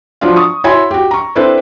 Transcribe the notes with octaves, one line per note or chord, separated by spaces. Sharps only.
F3 F#3 D4 F4
C#6 D#6
E4 F#4 C#5 G#5 B5 C6
F#4 G4
A#5 C#6
C4 D4 E4 A4 B4 C5